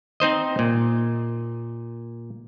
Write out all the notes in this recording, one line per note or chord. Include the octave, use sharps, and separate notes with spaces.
C4 D#4 C5 D#5
A#2